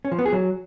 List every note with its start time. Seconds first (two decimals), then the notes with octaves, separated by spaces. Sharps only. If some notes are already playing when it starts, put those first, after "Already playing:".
0.05 C#4
0.12 F3
0.19 B3
0.26 G#4
0.32 F#3